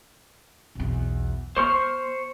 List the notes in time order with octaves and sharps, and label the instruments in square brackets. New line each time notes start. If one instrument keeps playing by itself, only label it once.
[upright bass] B1 E2
[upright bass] B3 [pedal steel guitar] C5 C#6 F6